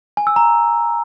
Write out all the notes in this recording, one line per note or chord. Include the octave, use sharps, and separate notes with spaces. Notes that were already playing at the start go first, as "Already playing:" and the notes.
G#5
E6
A#5